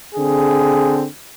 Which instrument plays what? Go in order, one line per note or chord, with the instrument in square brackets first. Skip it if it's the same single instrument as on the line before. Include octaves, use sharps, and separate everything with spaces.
[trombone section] D3 C4 G#4